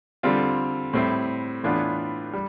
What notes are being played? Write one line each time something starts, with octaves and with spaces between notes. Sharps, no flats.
D3 G3 C4 F4
A2 G3 C4 E4
A2 E3 B3 D4 F4
G3